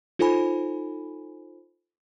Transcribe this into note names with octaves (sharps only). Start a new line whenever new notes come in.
D#4 F4 A4 C5 G#5 B5